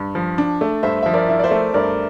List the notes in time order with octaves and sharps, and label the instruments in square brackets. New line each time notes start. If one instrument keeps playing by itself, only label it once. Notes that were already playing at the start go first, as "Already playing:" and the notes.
Already playing: [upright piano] G2
F3
D4
A3
[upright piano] G2 [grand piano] C5 E5
[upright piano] F3 [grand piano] E5
[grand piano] A#4 D5
[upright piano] E4
[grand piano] D5
C5 E5
[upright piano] A3
[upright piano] G2 [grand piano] A#4 D5